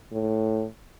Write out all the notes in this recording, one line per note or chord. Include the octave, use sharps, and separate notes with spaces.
A2